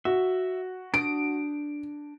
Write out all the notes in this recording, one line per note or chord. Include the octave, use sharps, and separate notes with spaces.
F#4 E5
D4 D#6 D7